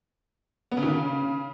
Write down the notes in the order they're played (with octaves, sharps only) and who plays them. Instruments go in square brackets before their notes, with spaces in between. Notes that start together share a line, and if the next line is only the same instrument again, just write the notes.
[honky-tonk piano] B3
C#3
D#3
C#3